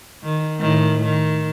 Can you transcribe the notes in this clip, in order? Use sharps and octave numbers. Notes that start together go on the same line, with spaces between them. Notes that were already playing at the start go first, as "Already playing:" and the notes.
D#3
A2 D#3
D#3